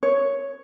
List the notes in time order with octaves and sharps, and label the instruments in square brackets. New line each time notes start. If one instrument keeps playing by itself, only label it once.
[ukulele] C#5